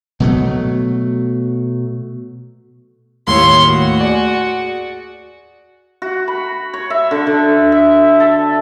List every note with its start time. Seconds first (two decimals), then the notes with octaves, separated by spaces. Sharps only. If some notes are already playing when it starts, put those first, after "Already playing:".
0.20 B2 F#3 A3
3.27 D#2 A2 C#5 C6
3.65 F#4
4.01 G#4 D5
6.02 F#4
6.28 B5
6.74 C#5
6.90 E5
7.11 D3
7.27 D3
7.72 E5
8.20 A4